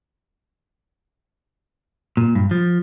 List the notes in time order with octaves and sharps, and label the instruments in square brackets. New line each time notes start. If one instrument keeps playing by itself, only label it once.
[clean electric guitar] A#2
G2
F3